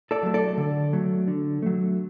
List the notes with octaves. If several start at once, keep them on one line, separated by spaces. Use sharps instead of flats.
A4 D5
F#3 A3
A4 D5
D3
F#3 A3
D3
F#3 A3